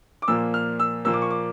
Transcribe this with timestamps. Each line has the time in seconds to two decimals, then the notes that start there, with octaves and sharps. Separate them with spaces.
0.22 D6
0.28 A#2 F3 A#3 E6
0.54 F6
0.80 E6
1.05 A#2 F3 A#3 E6
1.13 D6
1.22 C#6
1.30 D6